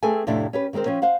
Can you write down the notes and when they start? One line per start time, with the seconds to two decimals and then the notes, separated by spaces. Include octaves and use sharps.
0.03 A3 C4 G#4 A4 B4 G#5
0.27 F2 A2 C3 A3 D4 E4
0.53 C#4 G4 B4
0.73 D#3 G#3 C4 A#4 C5
0.86 F3 C4 C#4
1.02 C5 F5 F#5